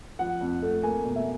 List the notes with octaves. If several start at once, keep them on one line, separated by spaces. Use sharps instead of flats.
F3 F#5
F2
A3
A#3 G#5
B2
E5